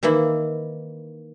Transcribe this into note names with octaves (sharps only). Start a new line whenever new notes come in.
D#3 E3 A#3 E4